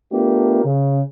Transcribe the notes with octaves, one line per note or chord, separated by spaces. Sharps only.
A3 B3 D4 F4 G4 A#4
C#3